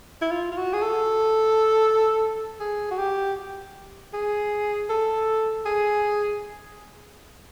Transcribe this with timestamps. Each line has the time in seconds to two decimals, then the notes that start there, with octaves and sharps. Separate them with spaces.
0.21 E4
0.31 F4
0.52 F4
0.57 F#4
0.73 G#4
0.82 A4
2.60 G#4
2.91 F#4
2.98 G4
4.13 G#4
4.89 A4
5.66 G#4